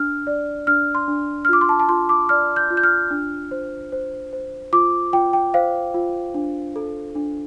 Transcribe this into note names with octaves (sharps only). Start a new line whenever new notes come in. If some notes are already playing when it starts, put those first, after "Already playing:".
Already playing: D4 F6
D5
D4 F6
C6
D4
F6
F4 D6
C6
A5
A5
F4 C6
D6
D5 F6
G6
F4
G6
F6
D4
C5
C5
C5
F4 D6
F4 G5
G5
C5 F5
F4
D4
A4
D4